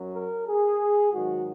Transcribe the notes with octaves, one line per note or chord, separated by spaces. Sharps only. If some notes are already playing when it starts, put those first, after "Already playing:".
Already playing: F#2 F#3
A#4
G#4
G#2 D#3 F#3 F#4